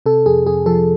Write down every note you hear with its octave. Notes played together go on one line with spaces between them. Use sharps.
C3 A4
F2 G#4
F2 G#4
F3 A4